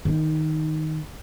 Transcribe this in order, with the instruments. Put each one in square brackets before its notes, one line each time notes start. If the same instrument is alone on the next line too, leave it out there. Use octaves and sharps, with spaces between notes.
[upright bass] D#3 D#4